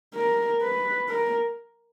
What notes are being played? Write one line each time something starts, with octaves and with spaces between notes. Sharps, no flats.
A#4
B4
A#4